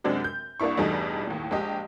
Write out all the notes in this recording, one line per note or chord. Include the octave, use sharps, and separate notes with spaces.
F#2 C3 G#3 C4 D4 F#4
G6
C2 A#3 D4 E4 C#6
E2 G2 B2 G3 A3 D#4
D#2 A2
A#1 G#3 G4 D#5